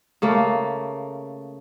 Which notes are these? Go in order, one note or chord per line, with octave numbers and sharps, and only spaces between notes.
C#3 A3 A#3